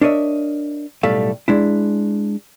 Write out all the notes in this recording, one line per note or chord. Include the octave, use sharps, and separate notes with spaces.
D4 A#4 C#5 D#5 E5
B1 A2 G3 A3 A4 F5
G#3 D4 E4